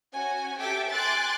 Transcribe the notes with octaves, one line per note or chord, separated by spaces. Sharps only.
C#4 F#4 G#5
G4 A4 E5 G5 D6
G5 G#5 C6 D6 F#6 A6